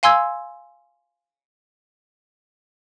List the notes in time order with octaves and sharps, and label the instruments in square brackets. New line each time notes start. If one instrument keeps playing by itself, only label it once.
[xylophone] F5 G#5 C6 E6 G#6